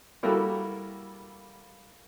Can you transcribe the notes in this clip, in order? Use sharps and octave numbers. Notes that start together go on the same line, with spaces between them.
G3 A#3 E4 F#4 A4